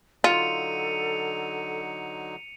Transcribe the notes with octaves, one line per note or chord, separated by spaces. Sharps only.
D3 F#3 D#4 F4 A4 C#7 D#7 F7